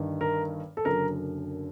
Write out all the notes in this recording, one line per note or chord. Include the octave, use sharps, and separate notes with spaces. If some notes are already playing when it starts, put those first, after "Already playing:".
Already playing: G1 G2 D#3
A#4
A4
F#1 F#2 D3 A#4